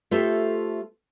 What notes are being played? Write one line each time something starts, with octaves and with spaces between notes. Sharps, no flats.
A3 F4 G4 A4 C5 E5